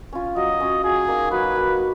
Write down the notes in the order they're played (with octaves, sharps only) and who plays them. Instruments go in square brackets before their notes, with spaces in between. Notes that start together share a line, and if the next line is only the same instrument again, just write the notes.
[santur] C#4 F4
[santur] F#3 [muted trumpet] D#5
[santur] C#4 F4
[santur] F#3 [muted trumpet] G#4
[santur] A#3 D#4
[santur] F#3 [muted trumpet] B4
[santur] A#3 D#4